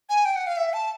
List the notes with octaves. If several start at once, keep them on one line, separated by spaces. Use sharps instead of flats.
G#5
G5
F#5
F5
E5
A5